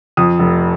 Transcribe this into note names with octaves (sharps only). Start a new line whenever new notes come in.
F2 D#6
F1